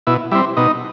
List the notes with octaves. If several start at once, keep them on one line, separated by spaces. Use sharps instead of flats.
B2 E4
G3 C4 E4
B2 D#4